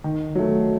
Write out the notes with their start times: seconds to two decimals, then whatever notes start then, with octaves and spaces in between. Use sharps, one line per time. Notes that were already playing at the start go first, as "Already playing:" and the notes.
0.04 D#3
0.35 F#3 A3